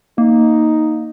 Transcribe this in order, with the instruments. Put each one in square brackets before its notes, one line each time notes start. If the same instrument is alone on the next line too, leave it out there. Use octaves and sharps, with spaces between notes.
[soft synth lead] A#3 [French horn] D#4